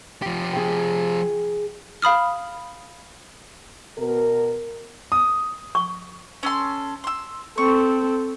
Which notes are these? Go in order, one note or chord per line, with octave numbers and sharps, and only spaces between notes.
F3 G4
G#4 G5
F5 B5 D#6 F6
B2 A#4
D#6
C#6
C#4 A4 C6
C6 E6
C4 A4 C#6